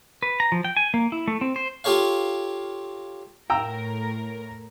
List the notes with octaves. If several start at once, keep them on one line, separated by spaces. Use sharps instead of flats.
B4
A#5
F3
G5
G#5
A#3
E4
A3
C4
C5
F4 G4 A4 C#5 F5
A2 A#4 G5 A#5 E6